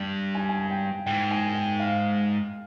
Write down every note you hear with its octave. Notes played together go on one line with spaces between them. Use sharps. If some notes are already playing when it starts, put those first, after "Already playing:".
Already playing: G2
G#5
G#5
G5
G#2 G5
G#5
G5
F5